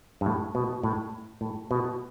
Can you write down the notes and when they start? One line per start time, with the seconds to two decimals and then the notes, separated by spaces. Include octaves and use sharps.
0.21 G2
0.26 A2
0.55 B2
0.83 A2
1.41 A2
1.71 B2